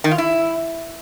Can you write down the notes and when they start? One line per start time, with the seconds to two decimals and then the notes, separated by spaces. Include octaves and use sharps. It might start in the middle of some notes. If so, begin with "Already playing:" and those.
0.04 D#3
0.11 F4
0.18 E4